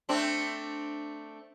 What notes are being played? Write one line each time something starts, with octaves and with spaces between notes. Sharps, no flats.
A3 C4 D4